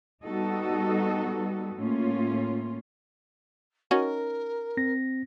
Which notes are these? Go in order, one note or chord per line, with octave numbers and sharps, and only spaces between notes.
G3 B3 D#4 F#4 A4 D#5
A2 A#3 C#4 F4
C#4 D#4 F#4 A#4
C4 A#6